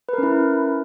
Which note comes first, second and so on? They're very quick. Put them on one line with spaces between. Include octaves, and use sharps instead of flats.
B4 A#4 C#4 E4